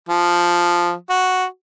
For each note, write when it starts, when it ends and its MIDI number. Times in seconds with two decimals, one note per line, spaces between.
0.09 0.93 53
1.10 1.45 66